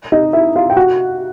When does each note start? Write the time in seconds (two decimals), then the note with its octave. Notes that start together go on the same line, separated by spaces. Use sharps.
0.12 D#4 D#5
0.33 E4 E5
0.56 F4 F5
0.70 G5
0.76 F#4 F#5